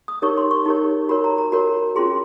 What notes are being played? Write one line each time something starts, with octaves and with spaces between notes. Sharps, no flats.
D#6
D#4 G4 A#4 C#5 C#6
C6
C#6
D#4 G4 A#4 C#5 C#6
F#4 A#4 C#5 B5
A#5
A#5
F#4 A#4 C#5 B5
C#4 F4 G#4 C6